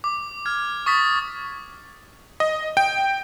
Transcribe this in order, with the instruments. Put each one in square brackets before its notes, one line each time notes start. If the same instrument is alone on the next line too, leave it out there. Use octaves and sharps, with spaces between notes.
[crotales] D6
F6 G#6
C#6 D#6 A6 B6
[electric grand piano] D#5
G5